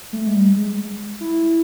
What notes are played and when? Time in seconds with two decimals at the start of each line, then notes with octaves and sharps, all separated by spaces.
0.13 A3
0.27 G#3
0.35 G3
0.56 G#3
1.21 E4